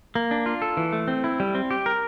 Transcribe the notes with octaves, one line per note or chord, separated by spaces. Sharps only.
A#3
D4
F4
A4
E3
A3
C4
E4
G3
C4
G4
A#4